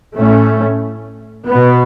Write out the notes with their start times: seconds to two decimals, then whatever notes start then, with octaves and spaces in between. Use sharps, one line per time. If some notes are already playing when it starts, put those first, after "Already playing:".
0.15 A2 A3 C#4
1.48 B2 B3